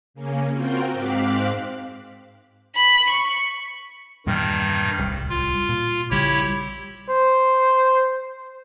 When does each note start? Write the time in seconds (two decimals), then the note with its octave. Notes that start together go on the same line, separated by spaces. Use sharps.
0.14 C#3 A#3 C#4
0.52 C4 F4 F#4 A#4 G5
0.92 G#2 C4 F5 D6 F#6 B6
2.76 B5
3.09 C#6
4.27 E2 G2 A#2 D#3 G3
4.98 D1 C2 G3
5.29 F4
5.69 A#2
6.11 A#1 C#3 G3 E4 G4 C#5
7.08 C5